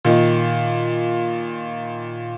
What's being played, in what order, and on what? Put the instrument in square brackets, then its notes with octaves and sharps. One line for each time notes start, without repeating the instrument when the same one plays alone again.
[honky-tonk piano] A#2 D#3